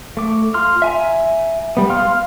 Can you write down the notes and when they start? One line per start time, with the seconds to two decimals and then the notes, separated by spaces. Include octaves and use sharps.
0.17 A3 D6
0.54 F4 C6 F6
0.82 E5 G#5 A#5
1.77 G3 B3
1.89 F5 C6 F6